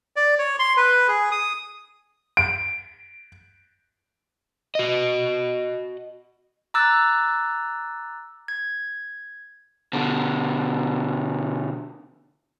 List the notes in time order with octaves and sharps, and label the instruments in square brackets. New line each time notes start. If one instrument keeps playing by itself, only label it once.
[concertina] D5
C#5
C6
B4
G#4
D#6
[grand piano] D7
[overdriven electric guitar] F#4 D#5
[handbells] A#5 D6 E6 F#6 A6
G#6
[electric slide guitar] B2 D3